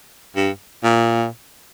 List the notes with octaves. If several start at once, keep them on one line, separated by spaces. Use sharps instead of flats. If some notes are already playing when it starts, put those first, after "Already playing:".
G2
A#2